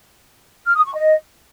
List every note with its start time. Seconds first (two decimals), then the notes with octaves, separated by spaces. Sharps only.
0.66 F6
0.75 D#6
0.85 C#6
0.94 D#5